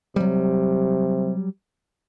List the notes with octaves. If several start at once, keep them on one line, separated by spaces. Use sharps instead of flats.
C3 F#3 G3